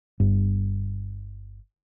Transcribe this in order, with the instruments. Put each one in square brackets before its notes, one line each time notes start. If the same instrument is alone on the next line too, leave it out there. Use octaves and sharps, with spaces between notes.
[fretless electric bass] G1 G2